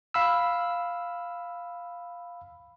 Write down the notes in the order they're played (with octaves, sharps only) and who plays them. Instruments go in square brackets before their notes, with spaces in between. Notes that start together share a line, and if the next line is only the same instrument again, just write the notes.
[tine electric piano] F5 B5 E6